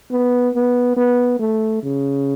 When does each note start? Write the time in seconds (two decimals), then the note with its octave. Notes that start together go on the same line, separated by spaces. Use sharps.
0.11 B3
0.54 B3
0.96 B3
1.39 A3
1.83 C#3